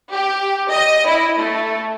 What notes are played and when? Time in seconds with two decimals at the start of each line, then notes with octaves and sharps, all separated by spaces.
0.12 G4
0.71 D#5
1.07 E4
1.39 A3